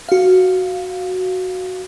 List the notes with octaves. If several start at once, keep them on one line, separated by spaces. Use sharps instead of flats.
F#4 F5